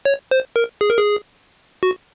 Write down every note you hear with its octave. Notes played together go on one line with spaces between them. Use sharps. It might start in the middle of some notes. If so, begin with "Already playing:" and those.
C#5
C5
A#4
G#4
A#4
G#4
F#4